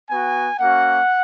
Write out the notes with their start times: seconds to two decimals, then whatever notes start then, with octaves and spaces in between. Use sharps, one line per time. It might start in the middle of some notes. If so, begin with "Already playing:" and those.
0.09 B3 F#4 G#5
0.59 A#3 C#4 F#4 F#5